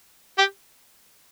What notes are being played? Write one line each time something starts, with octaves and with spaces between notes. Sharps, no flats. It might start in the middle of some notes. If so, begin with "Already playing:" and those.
G4